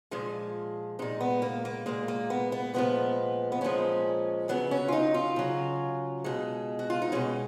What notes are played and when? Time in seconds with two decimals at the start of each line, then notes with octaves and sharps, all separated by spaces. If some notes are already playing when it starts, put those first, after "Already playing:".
0.11 A#2 F3 G#3
0.99 A#2 G#3 D#4
1.21 B3
1.42 A#3
1.65 A#3
1.86 A#2 G#3 A#3
2.08 A#3
2.30 B3
2.52 B3
2.74 A#2 F3 G#3 B3
3.52 B3
3.61 A#2 F3 G#3 C#4
4.49 C#3 F#3 B3
4.71 C#4
4.88 F4
4.92 D#4
5.14 F4
5.36 C#3 F#3
6.24 B2 G#3
6.79 F#4
6.90 F4
7.02 D#4
7.12 B2 G#3 C#4